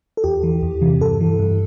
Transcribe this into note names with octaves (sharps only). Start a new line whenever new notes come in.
A4
E2 G4
E3
E2
C3 E3
G2 A4
E3
G2